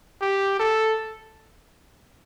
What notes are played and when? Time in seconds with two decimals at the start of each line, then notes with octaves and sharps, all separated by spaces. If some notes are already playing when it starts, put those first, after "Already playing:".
0.22 G4
0.59 A4